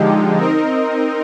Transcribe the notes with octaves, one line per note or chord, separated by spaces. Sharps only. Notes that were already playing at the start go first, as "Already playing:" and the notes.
Already playing: D3 F3 G#3 D#4 G4
C4 D#4 A#4 D#5